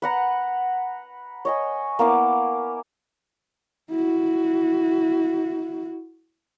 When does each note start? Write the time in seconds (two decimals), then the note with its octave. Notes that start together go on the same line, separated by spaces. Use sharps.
0.02 B4 F#5 A#5
1.45 C#5 D#5 G#5
1.99 A#3 B3 E4 D6
3.91 E4 F#4